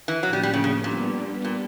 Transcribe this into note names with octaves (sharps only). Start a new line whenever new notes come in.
E3
A2 F3 F#3 A#3 C#4
G3
G3
C#3
C#3
A#2 G3 B3 D4 G4
A#2